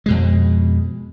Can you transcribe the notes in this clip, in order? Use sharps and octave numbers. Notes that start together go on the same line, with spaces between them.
F2 B2 G#3